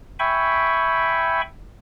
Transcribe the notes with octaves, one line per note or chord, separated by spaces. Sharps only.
E5 G5 G#5 B5 C#6